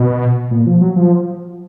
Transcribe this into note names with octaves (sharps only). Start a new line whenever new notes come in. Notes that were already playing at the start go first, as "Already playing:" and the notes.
Already playing: B2
A#2
F3
F#3
F3